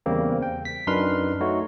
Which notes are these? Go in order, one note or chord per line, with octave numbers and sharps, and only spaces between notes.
E2 C#3 G3 A#3 C4
G5
B6
F#2 D4 D#4 B4 C6 F6
A3 D#4 F#4 C#5